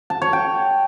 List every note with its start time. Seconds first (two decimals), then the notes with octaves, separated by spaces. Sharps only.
0.10 A5
0.22 C#5
0.33 G5